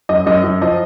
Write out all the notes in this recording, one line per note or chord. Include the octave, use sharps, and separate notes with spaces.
F#2 D#5
F#2 D#5
F#2
F3 D#5